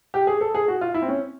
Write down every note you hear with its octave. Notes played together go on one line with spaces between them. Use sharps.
G4
G#4
A4
G#4
F#4
F4
E4
C4
C#4